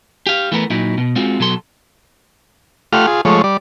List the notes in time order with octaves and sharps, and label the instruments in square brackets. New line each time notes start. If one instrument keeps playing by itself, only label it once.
[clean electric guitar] G4 F5
E3 A3 B3 A#4
A#2 F#3 D#4 E4
B2
G#3 C4 F4 F#4
B2 F#3 A4 C6
[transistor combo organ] A3 F4 G4 F#5 F6
F4 G#4
F3 G#3 A3 C#5
G3 D5